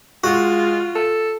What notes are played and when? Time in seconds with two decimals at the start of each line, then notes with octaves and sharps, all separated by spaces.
0.24 G#3 F4 F#4
0.95 A4